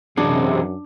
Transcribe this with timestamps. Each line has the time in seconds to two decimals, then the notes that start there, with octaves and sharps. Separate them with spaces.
0.17 F#2 C3 E3 D4 F#4 G#4